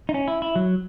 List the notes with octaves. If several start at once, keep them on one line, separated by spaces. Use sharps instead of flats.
D#4
C#4
E4
E4
F#3